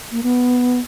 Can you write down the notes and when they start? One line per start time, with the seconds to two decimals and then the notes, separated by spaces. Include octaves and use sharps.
0.12 A#3
0.23 B3